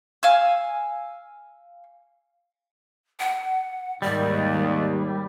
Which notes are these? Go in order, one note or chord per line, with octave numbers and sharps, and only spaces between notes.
F5 G#5 E6
F#5
D#2 G#2 D#3 G3 D5